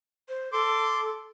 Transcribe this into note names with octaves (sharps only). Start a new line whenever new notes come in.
C5
A4 C6 D6